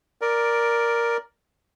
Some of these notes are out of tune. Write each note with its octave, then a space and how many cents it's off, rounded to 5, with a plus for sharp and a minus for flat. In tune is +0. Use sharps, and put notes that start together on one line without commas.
A#4 +5 D5 +0